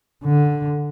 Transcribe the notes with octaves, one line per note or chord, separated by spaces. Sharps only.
D3